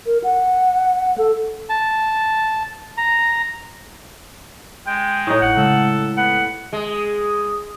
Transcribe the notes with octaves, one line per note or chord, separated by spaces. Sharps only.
A#4
F#5
A4
A5
A#5
G#3 G5
A2 D#4 A4 A#5 D#6
A1 F#5
C#3 G#3 A4 F5
B3 F#5
G#3